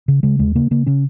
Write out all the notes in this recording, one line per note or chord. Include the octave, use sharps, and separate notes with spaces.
C#3
C#3 G#3
D#2 G#3
C#3 A#3
C#3 A#3
C#3 C#4